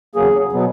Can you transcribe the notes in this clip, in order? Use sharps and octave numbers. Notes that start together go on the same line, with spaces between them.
E2 C#3 F#3 A#3 G#4
B2 F#3 B3